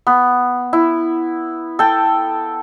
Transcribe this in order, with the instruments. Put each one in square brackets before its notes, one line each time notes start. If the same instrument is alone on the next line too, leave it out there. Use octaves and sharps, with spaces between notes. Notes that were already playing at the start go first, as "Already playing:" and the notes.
[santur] B3
E4
A4 G5